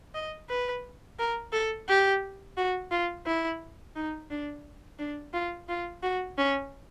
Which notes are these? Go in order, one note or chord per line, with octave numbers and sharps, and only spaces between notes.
D#5
B4
A#4
A4
G4
F#4
F4
E4
D#4
D4
D4
F4
F4
F#4
C#4